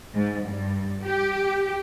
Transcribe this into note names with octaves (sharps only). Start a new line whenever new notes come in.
G#2
G2
G4